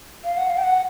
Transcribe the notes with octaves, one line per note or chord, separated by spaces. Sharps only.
F5
F#5
F5
G5
F#5